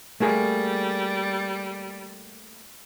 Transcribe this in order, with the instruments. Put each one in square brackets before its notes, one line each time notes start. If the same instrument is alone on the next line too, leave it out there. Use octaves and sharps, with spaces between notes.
[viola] G3 [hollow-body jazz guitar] A3 A#3 G#4